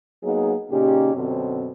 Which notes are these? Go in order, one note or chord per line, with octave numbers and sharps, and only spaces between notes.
F#3 A#3 B3 D#4 G#4
A#2 C#3 C#4 D#4 G4
F#2 B2 D3 C4